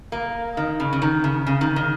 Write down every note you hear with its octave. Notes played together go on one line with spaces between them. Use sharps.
A#3
D#3
C#3
C#3
D#3
C#3
C#3
D#3
D#3